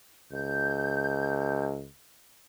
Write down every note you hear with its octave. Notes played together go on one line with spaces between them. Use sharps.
C#2 G6